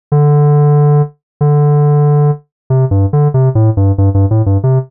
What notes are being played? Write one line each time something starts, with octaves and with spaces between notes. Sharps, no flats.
D3
D3
C3
G2
D3
C3
A2
G2
G2
G2
A2
G2
C3